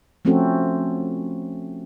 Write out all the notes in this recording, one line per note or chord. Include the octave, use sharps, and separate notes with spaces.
F3 A3 C4 C#4 F#4 A4